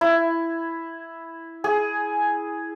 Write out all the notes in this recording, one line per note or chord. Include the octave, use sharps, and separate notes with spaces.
E4
G#4